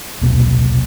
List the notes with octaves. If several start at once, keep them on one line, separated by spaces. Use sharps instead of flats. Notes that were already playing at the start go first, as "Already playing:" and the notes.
D#1 B1 C3 A#3